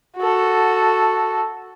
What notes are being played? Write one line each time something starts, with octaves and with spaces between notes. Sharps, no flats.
F#4 A4